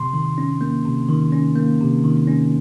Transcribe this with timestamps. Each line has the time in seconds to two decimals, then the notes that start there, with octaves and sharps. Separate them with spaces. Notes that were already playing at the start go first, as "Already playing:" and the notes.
Already playing: C3 C6
0.13 D#3
0.38 C#4
0.61 A#3
0.85 C3
1.08 D#3
1.32 C#4
1.56 A#3
1.81 C3
2.04 D#3
2.27 C#4